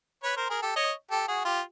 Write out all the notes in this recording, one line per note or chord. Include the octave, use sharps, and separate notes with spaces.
B4 C#5
A#4 C5
G#4 A#4
G4 A4
C#5 D#5
G4 A4
F#4 G#4
F4 G4